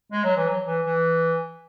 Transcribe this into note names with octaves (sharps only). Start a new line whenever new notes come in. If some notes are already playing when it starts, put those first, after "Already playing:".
G#3
F#3
E3
F#3
E3
E3